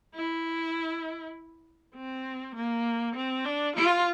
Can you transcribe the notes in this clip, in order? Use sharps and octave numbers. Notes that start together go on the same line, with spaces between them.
E4
C4
A#3
C4
D4
F4